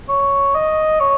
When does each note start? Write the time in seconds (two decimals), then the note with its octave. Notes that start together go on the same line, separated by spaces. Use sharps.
0.09 C#5
0.54 D#5
1.00 C#5